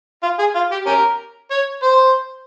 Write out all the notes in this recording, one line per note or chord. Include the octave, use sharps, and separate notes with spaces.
F4
G#4
F4
G4
C#4 G4 A#4
C#5
C5